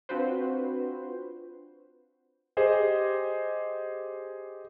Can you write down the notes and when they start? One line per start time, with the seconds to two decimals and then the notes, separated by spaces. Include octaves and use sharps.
0.09 C4 D4 F4 F#4 B4 C5
2.57 G4 G#4 C5 D#5